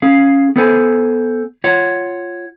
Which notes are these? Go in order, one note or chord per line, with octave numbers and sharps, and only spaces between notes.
C#4 G#4 F5
B3 G#4 A4 C5 F#5 G#5
F4 C#5 F#5